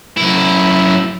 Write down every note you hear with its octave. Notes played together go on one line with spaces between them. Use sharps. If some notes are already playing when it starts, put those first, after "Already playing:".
F#2 E4